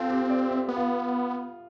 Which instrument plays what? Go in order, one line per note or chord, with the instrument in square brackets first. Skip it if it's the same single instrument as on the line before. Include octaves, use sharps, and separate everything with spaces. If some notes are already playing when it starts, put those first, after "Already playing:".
Already playing: [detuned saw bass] C4 [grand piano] F4 A4
[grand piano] G4
D5
E5
[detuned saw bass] B3
[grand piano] F4